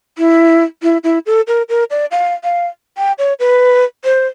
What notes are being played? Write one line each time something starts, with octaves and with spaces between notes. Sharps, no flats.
E4
E4
E4
A4
A#4
A#4
D5
F5
F5
G5
C#5
B4
C5